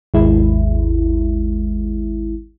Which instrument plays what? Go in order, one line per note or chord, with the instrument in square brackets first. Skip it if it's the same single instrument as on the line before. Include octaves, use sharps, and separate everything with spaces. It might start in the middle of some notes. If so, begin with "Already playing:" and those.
[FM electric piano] G#1 D#2 G#3 E4